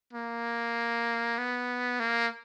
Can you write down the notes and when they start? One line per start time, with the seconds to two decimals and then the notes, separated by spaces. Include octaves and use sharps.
0.13 A#3
1.38 B3
2.00 A#3